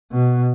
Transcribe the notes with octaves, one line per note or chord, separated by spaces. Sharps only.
B2